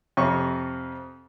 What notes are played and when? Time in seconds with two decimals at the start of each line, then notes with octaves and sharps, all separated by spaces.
0.17 F2 C3 C#6